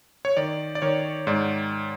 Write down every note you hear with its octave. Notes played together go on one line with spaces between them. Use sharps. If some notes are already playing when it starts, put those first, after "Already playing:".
C#5
D#3 D5
D5
D#3 C#5
G#2 D5